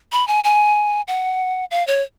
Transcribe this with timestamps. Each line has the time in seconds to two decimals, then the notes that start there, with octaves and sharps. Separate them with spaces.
0.12 B5
0.28 G#5
0.44 G#5
1.08 F#5
1.71 F5
1.87 C#5